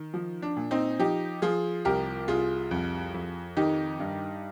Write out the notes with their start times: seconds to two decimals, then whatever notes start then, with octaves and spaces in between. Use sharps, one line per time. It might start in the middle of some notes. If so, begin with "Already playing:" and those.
Already playing: D#3
0.14 F3
0.42 D4
0.57 A#2
0.71 C4 D#4
0.99 F3 D#4 G4
1.42 F3 F4 G#4
1.85 C2 G4 A#4
2.28 C2 F4 G#4
2.71 F2
3.14 F2
3.57 D#3 D#4 G4
4.00 G2